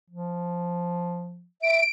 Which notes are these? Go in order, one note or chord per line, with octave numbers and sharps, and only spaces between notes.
F3
E5 D7